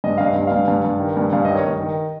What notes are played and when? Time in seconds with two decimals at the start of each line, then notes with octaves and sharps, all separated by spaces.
0.04 G2 D#5
0.18 F5
0.21 G2 D#5
0.36 G2
0.47 G2 F5
0.68 G2
0.85 G2
1.00 D#3
1.17 G2
1.33 G2 F5
1.45 D#3 D#5
1.55 C#5
1.65 G2 D#5
1.81 D#3